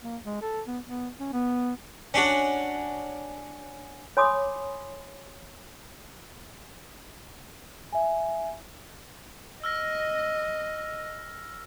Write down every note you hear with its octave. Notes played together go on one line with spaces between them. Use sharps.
A#3
G#3
A4
B3
B3
C#4
B3
C#4 D4 F#4
C#5 G#5 B5 C6 D6 D#6
E5 G#5
D#5 E6 F6 A#6